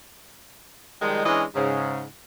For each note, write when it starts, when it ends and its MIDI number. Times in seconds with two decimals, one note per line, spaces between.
1.01 1.24 51
1.01 1.24 53
1.01 1.24 55
1.01 1.24 56
1.25 1.44 52
1.25 1.44 56
1.25 1.44 61
1.25 1.44 62
1.25 1.44 73
1.25 1.44 75
1.55 2.04 44
1.55 2.04 49